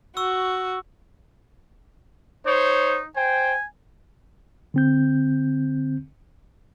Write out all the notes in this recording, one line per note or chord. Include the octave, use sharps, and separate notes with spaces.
F#4 C#6 E6
D#4 C5 C#5
C5 G5 G#5
D3 C4 G6